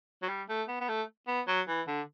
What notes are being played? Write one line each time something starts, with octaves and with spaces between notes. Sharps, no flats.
F#3
G3
A3
B3
B3
A3
B3
F#3
E3
D3